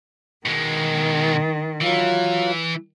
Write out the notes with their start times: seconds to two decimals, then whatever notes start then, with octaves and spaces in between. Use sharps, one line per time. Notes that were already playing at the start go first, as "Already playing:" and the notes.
0.46 B2 D#3 G#3
1.81 E3 F#3 F4